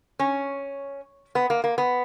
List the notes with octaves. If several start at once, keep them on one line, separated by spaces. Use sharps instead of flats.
C#4
B3
A#3
A#3
B3